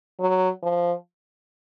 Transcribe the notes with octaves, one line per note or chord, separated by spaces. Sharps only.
F#3
F3